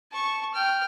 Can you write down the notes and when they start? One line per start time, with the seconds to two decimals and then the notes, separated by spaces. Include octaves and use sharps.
0.12 A5 C#6
0.54 G5 F6